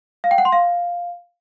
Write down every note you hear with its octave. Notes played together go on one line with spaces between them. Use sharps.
F5
G5
F#5
C6
F5